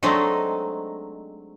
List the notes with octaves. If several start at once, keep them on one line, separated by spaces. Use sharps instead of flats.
F#3 G#3 A3 C4 D4 D#4